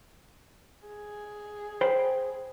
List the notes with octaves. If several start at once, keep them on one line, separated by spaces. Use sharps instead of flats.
G#4
C5 G5 B5